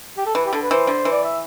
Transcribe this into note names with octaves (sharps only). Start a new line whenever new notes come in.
G4
A4
E3 B4
G4
D3 A4
B4
E3 C5
D3
E3
D5
E5